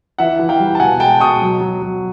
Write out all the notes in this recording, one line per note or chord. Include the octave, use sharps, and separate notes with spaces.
E3 E5 F#5
E3
F5 G5
G3
A5
B2 F#5 G#5
G#3 G5 A5
B2 C#6 D#6
F#3
F#3
F#3